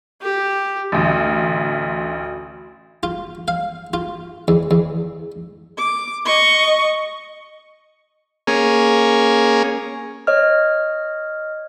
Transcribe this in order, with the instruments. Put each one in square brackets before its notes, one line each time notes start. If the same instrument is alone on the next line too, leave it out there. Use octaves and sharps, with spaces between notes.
[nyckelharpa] G4
[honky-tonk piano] A1 D2
[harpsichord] F4
F5
F4
E2
E2
[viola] D6
D#5 C#6
[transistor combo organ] A#3 C#4 G#4
[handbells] C#5 D#5 F6